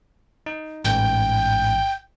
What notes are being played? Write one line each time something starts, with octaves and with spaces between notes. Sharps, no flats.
D#4
A1 G#2 G5